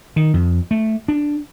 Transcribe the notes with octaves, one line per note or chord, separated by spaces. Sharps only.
D#3
F2
A3
D4